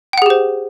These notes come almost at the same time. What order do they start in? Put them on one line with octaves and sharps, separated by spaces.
G5 F#5 G#4 G4 C5